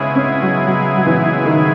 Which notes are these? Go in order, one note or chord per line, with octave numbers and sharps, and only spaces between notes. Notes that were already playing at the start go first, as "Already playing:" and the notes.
Already playing: C#3 G#3 B3 C#4 E4 G#4
C#4
F#3
F#3
F#3
E3
D#3